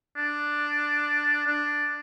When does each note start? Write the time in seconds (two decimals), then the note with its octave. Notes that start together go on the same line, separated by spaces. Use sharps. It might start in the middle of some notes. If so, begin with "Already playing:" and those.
0.16 D4
1.47 D4